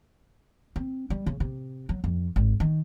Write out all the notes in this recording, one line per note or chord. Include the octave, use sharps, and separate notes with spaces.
C4
G3
C#3
C3
F#3
F2
G#1
D#3